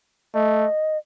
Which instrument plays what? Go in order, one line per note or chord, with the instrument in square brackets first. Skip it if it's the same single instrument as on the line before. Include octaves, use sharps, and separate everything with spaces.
[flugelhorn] A3 [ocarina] D#5